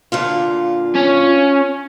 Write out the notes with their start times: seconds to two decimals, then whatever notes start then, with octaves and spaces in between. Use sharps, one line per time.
0.12 A#2 D3 F4
0.95 C#4